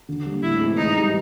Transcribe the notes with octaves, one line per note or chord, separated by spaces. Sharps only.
D3
G3 A#3
A2 E4
E3 G#3 C4
G#2 D#4
E3 G3